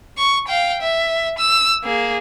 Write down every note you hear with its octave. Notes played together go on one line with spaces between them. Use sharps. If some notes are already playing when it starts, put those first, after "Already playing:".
C#6
F5 G5
E5
E6
A#3 G#4